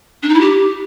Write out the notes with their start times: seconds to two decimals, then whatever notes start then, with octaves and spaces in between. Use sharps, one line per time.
0.22 D4
0.28 D#4
0.34 E4
0.40 G4